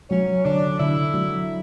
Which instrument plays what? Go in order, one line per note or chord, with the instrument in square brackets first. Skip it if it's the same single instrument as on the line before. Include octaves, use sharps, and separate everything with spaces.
[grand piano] F#3 [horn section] C#4
[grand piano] D3 [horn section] D4
[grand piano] D3 [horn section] E4
[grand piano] F#3